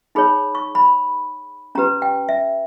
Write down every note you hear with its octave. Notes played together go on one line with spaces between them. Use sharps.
D#4 G#4 C#5 B5
C#6
B5
C#4 G4 B4 A#5
G5
E5